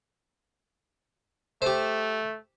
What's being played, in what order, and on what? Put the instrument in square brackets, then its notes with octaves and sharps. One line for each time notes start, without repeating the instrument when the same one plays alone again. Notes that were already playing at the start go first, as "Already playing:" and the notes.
[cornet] A3 [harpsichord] G4 C5